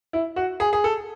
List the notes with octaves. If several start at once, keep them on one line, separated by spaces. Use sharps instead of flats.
E4
F#4
G#4
G#4
A4